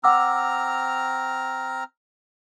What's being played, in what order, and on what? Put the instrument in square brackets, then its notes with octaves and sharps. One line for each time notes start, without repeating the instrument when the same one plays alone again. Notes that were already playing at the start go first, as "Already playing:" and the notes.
[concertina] C4 A#5 F6 [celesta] F#5 D6 E6